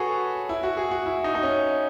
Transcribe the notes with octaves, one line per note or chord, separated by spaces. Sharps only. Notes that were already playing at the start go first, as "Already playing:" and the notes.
Already playing: F#4 G#4 A4 B4 C#5
E4
F#4
G#4
F#4
E4
D#4
D#4
C#4